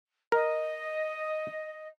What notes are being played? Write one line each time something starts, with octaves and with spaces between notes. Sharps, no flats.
A#4 D#5